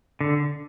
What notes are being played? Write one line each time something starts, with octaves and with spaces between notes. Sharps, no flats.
D3